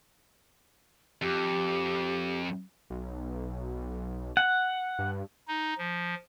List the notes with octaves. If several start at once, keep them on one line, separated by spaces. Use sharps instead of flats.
F2 G4
B1
F#5
G2
D#4
F3